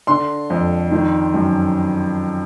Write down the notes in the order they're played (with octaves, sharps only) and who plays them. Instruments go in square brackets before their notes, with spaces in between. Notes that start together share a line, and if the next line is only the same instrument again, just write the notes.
[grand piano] D3 C6
F2
D#3
F#2